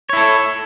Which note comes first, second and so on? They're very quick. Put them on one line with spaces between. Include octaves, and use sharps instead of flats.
C#5 E4 A4